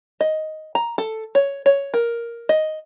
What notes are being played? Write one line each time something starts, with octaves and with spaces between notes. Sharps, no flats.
D#5
A#5
A4
C#5
C#5
A#4
D#5